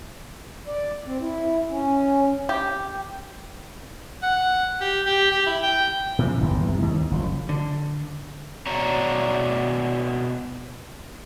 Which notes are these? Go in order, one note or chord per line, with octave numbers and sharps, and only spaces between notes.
D5
C4
E4
C#4
G4
F#5
G4
G4
G4
E4
G5
A#2 C#3 E3 F3
G1 E2 G2
C2 E3
D#2
F#1 A#2 F3
D3
B2 D4 C#5 A#5